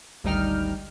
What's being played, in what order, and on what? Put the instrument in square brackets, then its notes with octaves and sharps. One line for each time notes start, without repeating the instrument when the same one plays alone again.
[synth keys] G#1 D2 G3 D#4 G5 F6